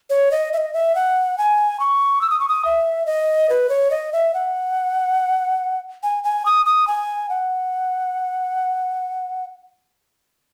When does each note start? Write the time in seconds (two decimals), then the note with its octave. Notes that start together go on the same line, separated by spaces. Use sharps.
0.10 C#5
0.31 D#5
0.53 E5
0.57 D#5
0.74 E5
0.95 F#5
1.38 G#5
1.80 C#6
2.21 E6
2.30 D#6
2.40 C#6
2.48 D#6
2.65 E5
3.06 D#5
3.50 B4
3.69 C#5
3.91 D#5
4.13 E5
4.34 F#5
6.03 G#5
6.24 G#5
6.46 D#6
6.66 D#6
6.88 G#5
7.29 F#5